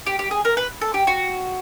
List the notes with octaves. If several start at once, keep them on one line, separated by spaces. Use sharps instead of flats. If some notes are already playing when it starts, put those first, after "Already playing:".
G4
G4
G#4
A#4
B4
A4
G4
F#4